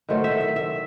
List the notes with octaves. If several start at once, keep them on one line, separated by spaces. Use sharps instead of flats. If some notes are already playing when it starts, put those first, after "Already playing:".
D#3 F#3 A3 C5
E5
E5
E5